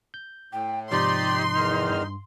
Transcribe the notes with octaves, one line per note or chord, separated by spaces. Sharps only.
G6
A2 G5
G#2 C3 F3 D#4 G4 D5 C6
E2 D#3 F6
G2